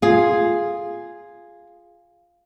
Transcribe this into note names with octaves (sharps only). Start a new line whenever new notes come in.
F4 G#4